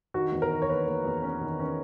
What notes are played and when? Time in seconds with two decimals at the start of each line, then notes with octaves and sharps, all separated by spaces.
0.14 D#3 F#4
0.32 E2
0.42 A#4
0.51 D#3
0.62 C#5
0.69 A#3 B4
0.87 A#3
1.05 E2
1.22 C#4
1.41 D#3
1.60 C#4